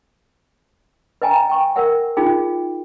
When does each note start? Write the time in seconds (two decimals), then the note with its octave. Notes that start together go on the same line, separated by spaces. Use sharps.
1.22 B4 D#5 G5 G#5 A#5
1.49 G5 C#6
1.76 A#4 B4 E5 F#5
2.17 D#4 F4 F#4 G#4 G5